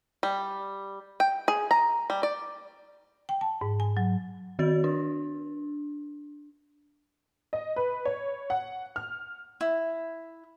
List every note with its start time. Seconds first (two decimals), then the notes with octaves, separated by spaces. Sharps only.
0.23 G3
1.20 G5
1.48 G#4
1.71 A#5
2.10 G3
2.23 D5
3.29 G5
3.41 A5
3.61 G#2
3.80 G#5
3.97 F#3
4.59 D#3 F#4 A6
4.84 D4
7.53 D#5
7.76 B4
8.05 C#5
8.50 F#5
8.96 F6
9.61 E4